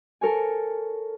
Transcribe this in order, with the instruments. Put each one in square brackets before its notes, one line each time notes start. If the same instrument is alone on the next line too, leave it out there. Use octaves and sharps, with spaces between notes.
[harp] A4 A#4 C#5 G#5